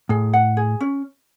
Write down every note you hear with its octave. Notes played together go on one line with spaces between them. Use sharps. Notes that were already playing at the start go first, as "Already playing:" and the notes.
A2 G#4
F#5
G#4
C#4